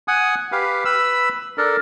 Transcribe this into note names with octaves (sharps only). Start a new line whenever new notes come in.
F#5 G#5 D#6
G4 B4 F5
B4 B5 E6
D4 A4 A#4